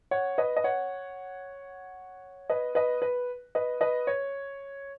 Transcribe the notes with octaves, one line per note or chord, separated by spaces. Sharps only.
C#5 F#5
B4 D#5
D#5
C#5 F#5
B4 D#5
B4 D#5
B4
B4 D#5
B4 D#5
C#5